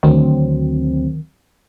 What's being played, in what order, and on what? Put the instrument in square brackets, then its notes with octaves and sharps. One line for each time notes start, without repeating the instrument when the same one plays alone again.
[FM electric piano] D2 F#3 C4 [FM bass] D#3